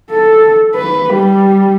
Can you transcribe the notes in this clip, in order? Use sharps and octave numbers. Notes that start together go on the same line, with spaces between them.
A4
B4
G3